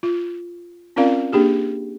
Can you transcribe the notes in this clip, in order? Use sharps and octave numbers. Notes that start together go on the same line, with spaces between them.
F4
C4 C#4 F4 A#4 D5 F5
A#3 D4 G4 G#4